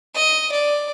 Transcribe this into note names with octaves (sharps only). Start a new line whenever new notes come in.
D#5
D5